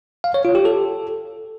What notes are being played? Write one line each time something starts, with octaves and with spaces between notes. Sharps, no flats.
F5
C#5
F4
G4
A4